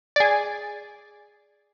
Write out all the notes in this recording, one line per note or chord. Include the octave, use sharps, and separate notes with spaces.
G#4 D5